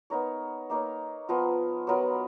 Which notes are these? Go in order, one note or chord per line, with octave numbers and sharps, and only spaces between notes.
B3 D#4 A#4 C#5
A#3 D#4 A#4 C#5
F3 B3 F4 A#4
F#3 B3 F4 A#4